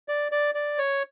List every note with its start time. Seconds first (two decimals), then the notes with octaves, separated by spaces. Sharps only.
0.08 D5
0.32 D5
0.55 D5
0.78 C#5